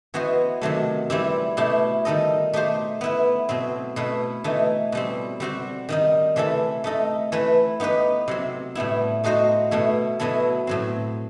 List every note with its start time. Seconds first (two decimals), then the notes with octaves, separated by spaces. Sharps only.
0.14 E3 B3 F#4 C5 D#5
0.61 C3 D#3 F#3 A3
1.10 E3 G3 C4 E4 G4
1.57 B2 A3 E4 G4
2.05 D#3 G3 D#4 A4 D#5
2.53 A3 D#4 G4 C5
3.01 B3 E4 B4
3.49 B2 F#3 C4
3.96 B2 A3 E4 B4
4.44 E3 A3 D#4
4.92 B2 G3 C4
5.40 G3 C4 F#4 C5
5.89 D#3 G3 D#4
6.36 C3 E3 A3 E4 A4
6.84 A3 D#4 A4 D#5
7.32 E3 A3 E4 B4
7.80 B3 D#4 G4 B4
8.28 C3 F#3 C4
8.75 A2 G3 B3 E4
9.24 A3 D#4 F#4 C5 D#5
9.71 B2 A3 E4
10.19 B2 F#3 B3 E4 A4
10.67 A2 F#3 C4